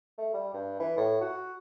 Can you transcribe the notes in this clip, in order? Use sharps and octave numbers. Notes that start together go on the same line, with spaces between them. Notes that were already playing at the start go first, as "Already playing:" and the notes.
A3
G3
G2
E3
A2
F#4